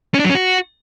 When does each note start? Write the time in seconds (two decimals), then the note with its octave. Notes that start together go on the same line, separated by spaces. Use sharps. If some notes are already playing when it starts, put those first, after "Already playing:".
0.14 C#4
0.19 D4
0.25 F#3
0.30 C#4
0.35 F#4